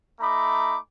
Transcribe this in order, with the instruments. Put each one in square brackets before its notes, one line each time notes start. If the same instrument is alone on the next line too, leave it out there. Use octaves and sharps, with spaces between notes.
[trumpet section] A3 D#4 A#5 B5 D6